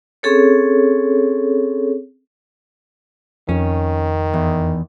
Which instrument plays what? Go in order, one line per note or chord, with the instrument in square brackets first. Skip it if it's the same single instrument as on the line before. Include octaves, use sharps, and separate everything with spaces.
[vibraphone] C4 C#4 G#4 A4 C#5
[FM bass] F2 [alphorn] D#3 [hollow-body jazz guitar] C#4
[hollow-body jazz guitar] E2